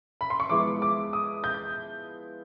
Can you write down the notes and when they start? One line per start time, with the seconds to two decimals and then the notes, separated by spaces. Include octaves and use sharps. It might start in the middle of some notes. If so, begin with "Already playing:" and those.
0.21 B5
0.30 C6
0.40 C#6
0.49 F3 G#3 B3 E4 D6
0.82 D6
1.13 D#6
1.44 G6